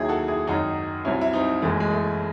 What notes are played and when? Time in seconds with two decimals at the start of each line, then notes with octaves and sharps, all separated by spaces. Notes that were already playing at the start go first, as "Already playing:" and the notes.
Already playing: D#2 D#3 F#3 E4 G#4
0.09 F#4 A4
0.28 E4 G#4
0.47 G#1 F#2 D#3 F#3 D#4 F#4
1.05 C2 C3 F#3 C#4 E4
1.21 E4
1.33 C4 D#4
1.62 F#1 F#2 E3 G#3 A3
1.80 G#3
1.91 A3